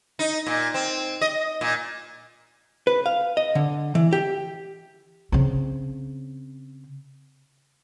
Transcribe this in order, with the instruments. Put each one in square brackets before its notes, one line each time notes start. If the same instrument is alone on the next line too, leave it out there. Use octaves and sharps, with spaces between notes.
[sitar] D#4
A#2
C4
D#5
A#2
[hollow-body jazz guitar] B4
F5
D#5
D3
E3
G4
[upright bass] C#3 C4